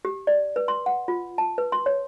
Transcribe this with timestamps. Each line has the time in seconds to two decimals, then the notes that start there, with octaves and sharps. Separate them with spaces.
0.05 G4
0.27 D5
0.56 B4
0.68 C6
0.86 F#5
1.08 F4
1.38 A5
1.58 B4
1.72 C6
1.86 C#5